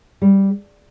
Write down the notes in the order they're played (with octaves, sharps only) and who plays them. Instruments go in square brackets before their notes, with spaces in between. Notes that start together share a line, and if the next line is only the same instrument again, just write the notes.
[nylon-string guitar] G3